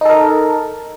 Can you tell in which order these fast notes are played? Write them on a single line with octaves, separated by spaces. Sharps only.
D#4 A4 A#4